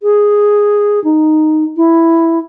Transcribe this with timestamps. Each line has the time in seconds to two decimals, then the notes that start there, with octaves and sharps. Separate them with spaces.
0.03 G#4
1.04 D#4
1.77 E4